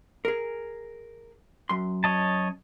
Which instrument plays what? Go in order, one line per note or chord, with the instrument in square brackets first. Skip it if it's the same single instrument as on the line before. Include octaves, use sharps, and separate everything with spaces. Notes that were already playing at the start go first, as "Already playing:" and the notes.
[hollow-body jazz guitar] G#4 A#4
F#2 C6
[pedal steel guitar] C#5 D#5 A5